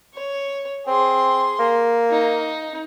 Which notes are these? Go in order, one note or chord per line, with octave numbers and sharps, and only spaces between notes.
C#5
C4 G#4 C6
A#3
D#4